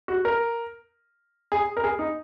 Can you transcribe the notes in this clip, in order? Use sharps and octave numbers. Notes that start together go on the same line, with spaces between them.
F#4
A#4
G#4
A#4
G#4
D#4